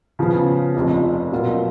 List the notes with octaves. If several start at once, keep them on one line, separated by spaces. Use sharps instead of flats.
C#3 F3 B3
F1 F2 F3
B2 F#3 A#3 F4